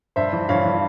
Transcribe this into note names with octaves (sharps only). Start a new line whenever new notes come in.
G2 C5 E5
E3
G2 C#5 F5
E3